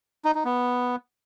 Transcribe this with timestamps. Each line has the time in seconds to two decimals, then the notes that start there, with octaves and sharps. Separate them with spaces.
0.25 D#4
0.35 D#4
0.45 B3